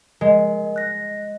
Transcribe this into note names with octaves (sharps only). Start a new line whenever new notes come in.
G#3 A#4 D#5
F#6 A#6